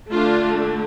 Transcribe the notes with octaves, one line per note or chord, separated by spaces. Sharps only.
D3 A3 D4 F4